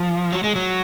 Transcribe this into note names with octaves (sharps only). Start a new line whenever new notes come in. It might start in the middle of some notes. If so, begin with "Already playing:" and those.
Already playing: F3
F#3
G#3
F#3